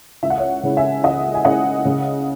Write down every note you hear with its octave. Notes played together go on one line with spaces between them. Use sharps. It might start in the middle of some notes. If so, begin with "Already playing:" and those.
C#2 E5
F#5
C#5 E5
C#3 G#3 C#4 E4
E5 G#5
C#2 D#5 F#5
G#5
C#3 G#3 C#4 E4 D#5 F#5
C#3